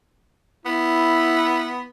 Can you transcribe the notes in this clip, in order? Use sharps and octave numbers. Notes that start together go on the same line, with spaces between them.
B3 E4